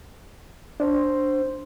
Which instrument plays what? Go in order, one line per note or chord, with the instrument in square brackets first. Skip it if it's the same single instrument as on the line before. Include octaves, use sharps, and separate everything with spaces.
[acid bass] D4 [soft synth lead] C5